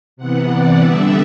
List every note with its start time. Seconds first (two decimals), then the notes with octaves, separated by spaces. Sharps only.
0.17 C3 E3 B3 F#5
0.48 D5
0.79 D3 G3 B3 D4 E5